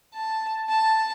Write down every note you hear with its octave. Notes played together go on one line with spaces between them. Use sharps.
A5
A5